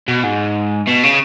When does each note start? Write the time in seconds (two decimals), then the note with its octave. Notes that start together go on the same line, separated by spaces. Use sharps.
0.08 B2
0.24 G#2
0.87 B2
1.03 C#3